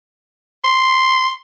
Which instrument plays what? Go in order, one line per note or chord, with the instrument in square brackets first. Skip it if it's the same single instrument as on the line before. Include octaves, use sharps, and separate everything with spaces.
[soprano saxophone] C6